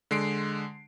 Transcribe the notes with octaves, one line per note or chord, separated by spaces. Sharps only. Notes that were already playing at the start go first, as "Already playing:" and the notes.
D3 G#3 C6 C7 D7